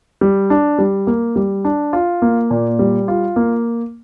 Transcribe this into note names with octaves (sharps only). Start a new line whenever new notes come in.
G3
D4
G3
A#3
G3
D4
F4
A#3
A#2
G3
F4
A#3